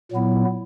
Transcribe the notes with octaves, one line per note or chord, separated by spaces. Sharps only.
A#2 F#3 B3 E4